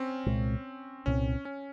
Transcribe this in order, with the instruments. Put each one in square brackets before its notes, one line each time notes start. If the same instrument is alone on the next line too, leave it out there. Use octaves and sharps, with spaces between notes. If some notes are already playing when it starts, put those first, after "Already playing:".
Already playing: [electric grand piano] C4 C#4
[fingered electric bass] C2 A#2 G#3 C4
[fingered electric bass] C2 A#2 G#3 C4 [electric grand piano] C#4
[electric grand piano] C#4